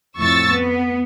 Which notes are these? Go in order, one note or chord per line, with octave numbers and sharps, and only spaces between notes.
F2 A2 C#6 E6 A6
B3